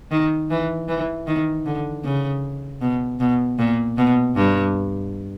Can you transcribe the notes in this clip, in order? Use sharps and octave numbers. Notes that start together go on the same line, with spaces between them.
D#3
E3
E3
D#3
D3
C#3
B2
B2
A#2
B2
G2